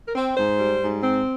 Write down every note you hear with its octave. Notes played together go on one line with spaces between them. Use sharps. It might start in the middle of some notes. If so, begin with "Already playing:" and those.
A#4
C4
G#2 C5
G3
G#2
C4